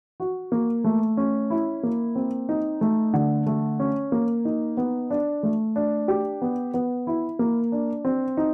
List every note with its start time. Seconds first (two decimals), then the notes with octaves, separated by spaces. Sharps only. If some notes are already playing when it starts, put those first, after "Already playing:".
0.20 F#4
0.52 A#3
0.84 A3
1.17 C#4
1.50 E4
1.83 A#3
2.15 C4
2.49 D#4
2.81 A3
3.13 D3
3.47 A3
3.80 C#4
4.12 A#3
4.45 D#4
4.77 B3
5.10 D4
5.43 A3
5.76 D4
6.08 G4
6.42 B3
6.74 B3
7.07 E4
7.39 A#3
7.72 D4
8.05 C4
8.37 D#4